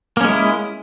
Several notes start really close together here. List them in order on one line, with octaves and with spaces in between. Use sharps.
A#3 C#4 G#3 E4